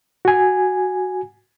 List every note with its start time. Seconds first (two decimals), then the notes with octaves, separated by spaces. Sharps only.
0.25 F#4 G#5